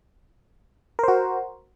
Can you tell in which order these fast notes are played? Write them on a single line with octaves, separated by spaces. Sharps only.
A#4 C5 F#4